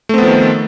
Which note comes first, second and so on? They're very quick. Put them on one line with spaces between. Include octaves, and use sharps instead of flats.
A3 C4 B3 F3 D#3